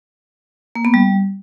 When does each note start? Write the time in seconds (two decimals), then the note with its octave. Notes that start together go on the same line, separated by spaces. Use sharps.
0.75 A#3
0.85 B3
0.94 G3